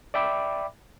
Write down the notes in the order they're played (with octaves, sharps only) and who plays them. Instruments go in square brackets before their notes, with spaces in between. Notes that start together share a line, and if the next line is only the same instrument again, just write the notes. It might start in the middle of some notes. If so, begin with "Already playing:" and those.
[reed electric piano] D5 E5 G5 B5 D6